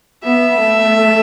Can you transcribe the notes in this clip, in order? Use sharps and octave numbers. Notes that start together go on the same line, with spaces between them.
B3 E5
A3